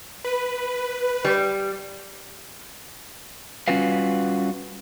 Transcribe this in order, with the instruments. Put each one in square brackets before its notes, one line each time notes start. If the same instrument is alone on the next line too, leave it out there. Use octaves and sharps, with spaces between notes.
[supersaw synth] B4
[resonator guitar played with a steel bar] G3
[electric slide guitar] G3 C#4 F4 F#4 B4 F5